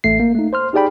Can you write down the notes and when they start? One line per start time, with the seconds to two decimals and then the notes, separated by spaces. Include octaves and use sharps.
0.04 A1 A3 C7
0.20 A#3
0.35 A3 D#4
0.53 C5 C6 F6
0.73 D#4 G4 G#4 D5 G5 B5